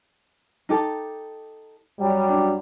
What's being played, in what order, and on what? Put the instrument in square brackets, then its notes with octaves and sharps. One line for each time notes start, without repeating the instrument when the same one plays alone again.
[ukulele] D#4 G4 A4
[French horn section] F#2 F#3 G3
[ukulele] D4